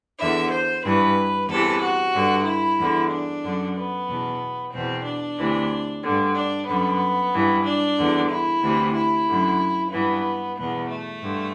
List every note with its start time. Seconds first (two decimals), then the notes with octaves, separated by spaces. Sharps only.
0.19 E2 D3 E5
0.52 C5
0.83 G2 E3 B4
1.49 E2 C3 E3 A4
1.82 F#4
2.14 G2 D3
2.46 E4
2.78 E2 D3
3.10 D4
3.44 F#2 D3
3.76 B3
4.08 E2 B2
4.73 E2 B2 C4
5.05 D4
5.39 D2 C3 E3
6.03 G2 D3
6.35 D4
6.67 F#2 D3 B3
7.33 G2 E3
7.65 D4
7.97 E2 D3
8.30 E4
8.62 D2 C3 E3
8.94 E4
9.28 F#2 D3
9.92 G2 E3 B3
10.57 E2 B2 B3
10.89 A3
11.22 G2 D3